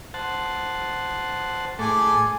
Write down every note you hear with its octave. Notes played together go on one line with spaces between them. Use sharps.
C5 F#5 A5
A2 A3 G#4 A4 G#5 D6